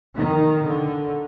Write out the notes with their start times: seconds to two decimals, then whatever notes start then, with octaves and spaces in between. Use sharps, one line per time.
0.15 D#3
0.64 D3